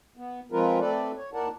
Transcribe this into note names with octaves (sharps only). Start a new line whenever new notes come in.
B3
F3 G#3 C4 F4 A#4 B4
A3 C4 A4 B4 D5
C#5
D#2 E4 A#4 D5 F#5 A5